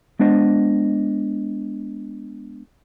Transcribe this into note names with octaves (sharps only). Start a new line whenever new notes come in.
G#3 B3 D4 C5 D#5